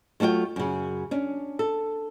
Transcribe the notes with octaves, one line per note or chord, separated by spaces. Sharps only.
F#3 A3 F4 F#5 G5
F#2 C#3
C#4 D4
A4